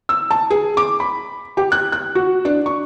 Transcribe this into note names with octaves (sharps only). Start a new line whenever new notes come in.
E6
A5
G#4
D6
B5
G4
F#6
F#6
F#4
D4
C#6